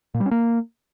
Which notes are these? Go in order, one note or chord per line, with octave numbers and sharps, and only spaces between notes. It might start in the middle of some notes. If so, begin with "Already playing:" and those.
A#2
G3
C#4
A#3